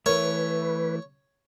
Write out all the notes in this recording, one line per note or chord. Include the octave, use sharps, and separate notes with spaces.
E3 A3 A#4 B4 C#5